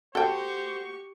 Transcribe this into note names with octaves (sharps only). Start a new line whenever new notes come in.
F#4 G4 A4 C5 G5 C#6